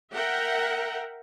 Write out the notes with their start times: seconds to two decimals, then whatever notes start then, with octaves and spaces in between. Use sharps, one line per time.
0.13 A#4 E5 F#5 G5